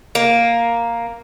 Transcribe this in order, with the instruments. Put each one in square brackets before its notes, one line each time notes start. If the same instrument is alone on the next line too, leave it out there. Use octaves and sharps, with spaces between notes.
[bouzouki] A#3